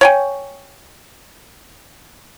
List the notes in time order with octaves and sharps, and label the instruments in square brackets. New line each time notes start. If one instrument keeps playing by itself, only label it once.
[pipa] C#5 G5 G#5